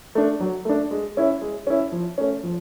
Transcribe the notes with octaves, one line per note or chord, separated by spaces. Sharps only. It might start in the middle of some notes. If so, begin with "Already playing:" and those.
A3 D4
F#3
A3 D4
G#3
C#4 E4
G#3
C#4 E4
F3
A3 C#4
F3